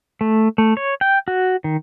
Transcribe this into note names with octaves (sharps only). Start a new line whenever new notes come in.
A3
A3
C#5
G5
F#4
D#3